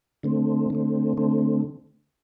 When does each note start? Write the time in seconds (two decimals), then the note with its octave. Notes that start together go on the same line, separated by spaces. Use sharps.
0.23 D3 A3 C4
0.70 D3 A3 C4
1.17 D3 A3 C4